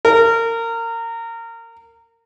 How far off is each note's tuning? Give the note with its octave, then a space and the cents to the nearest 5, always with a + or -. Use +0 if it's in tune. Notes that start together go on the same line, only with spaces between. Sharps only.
A#4 -25